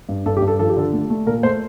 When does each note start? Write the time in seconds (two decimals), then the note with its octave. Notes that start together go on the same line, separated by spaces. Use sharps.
0.09 G2
0.26 G2 A4
0.37 G4
0.42 G2
0.48 A4
0.59 F3 A4
0.69 G4
0.77 D3 A4
0.93 A3
1.10 A3
1.26 A#2 A#4
1.43 A3 C5